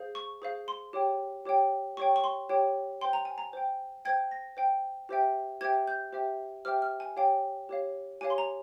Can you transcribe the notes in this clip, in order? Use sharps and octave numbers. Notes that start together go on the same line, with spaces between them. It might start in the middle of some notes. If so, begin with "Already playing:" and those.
Already playing: G#4 C5 F5
C#6
G#4 C5 F5
C6
G4 C#5 G5
G4 C#5 G5
G4 C#5 G5 C#6
C#6
C6
G4 C#5 G5
C5 G5 C6
A#5
G#5
A#5
C5 G5
C5 G5 G#6
A#6
C5 G5
G4 C5 E5 G5
G4 C5 E5 G5 G#6
G6
G4 C5 E5 G5
G4 C5 E5 G5 F6
F6
G#5
G4 C#5 F5 G5
G4 C#5 F5
G4 C#5 F5 G#5
C6
A#5